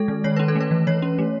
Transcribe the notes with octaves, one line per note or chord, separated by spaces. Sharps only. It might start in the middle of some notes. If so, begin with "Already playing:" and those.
Already playing: G#3 A4
D#3
D#3 C#5
C#4 B4
A4
A3
B4
E3
E3 C#5
C#4
A3